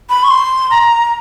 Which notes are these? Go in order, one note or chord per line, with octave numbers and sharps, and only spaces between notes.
B5
C#6
C6
A#5